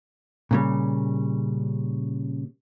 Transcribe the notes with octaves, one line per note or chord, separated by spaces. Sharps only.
A#2 C#3 G3